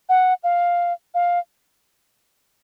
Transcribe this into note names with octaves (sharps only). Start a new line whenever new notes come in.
F#5
F5
F5